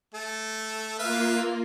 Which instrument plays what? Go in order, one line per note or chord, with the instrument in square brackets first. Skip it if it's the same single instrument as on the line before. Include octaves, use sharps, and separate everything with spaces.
[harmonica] A3 A4
[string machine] A#3 F4 [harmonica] B4 E5 F5